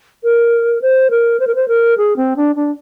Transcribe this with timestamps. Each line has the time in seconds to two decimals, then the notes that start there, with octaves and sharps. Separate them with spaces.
0.23 A#4
0.82 C5
1.10 A#4
1.40 C5
1.47 A#4
1.55 C5
1.68 A#4
1.97 G#4
2.16 C4
2.36 D4
2.56 D4